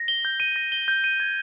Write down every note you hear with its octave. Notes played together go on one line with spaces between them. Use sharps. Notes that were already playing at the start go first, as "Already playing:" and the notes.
Already playing: A#6
G7
G6
D#7
A#6
G7
G6
D#7
G#6